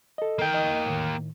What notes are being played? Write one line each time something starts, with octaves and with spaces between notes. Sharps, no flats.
A4 D#5
A#3 G5
D#5
A2 D#3